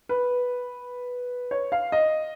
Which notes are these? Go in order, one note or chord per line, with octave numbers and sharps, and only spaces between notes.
B4
C#5
F5
D#5